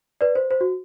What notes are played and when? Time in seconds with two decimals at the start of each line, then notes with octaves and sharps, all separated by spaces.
0.21 B4 D5
0.35 C5
0.51 C5
0.61 F#4